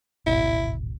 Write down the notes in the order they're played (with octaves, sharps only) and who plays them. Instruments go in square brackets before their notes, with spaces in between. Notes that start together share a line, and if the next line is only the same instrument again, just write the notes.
[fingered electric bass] D1 G#1 B2 [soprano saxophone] E4